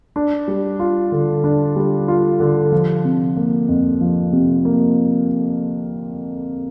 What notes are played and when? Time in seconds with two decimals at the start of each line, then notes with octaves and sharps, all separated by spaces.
0.16 D4
0.48 G3
0.80 F4
1.12 D3
1.44 D4
1.76 G3
2.08 F4
2.40 D3
2.72 F3
3.05 C3
3.37 A#3
3.69 F2
4.01 F3
4.33 C3
4.65 A#3